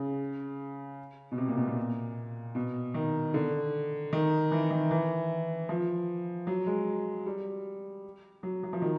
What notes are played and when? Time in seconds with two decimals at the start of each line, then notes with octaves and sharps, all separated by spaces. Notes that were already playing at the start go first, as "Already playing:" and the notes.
Already playing: C#3
1.32 B2
1.38 C3
1.48 A#2
1.57 B2
1.67 A#2
2.55 B2
2.94 D#3
3.34 D3
4.13 D#3
4.51 E3
4.71 D#3
4.91 E3
5.69 F3
6.47 F#3
6.67 G#3
7.26 G3
8.43 F#3
8.63 F#3
8.73 F3
8.82 D#3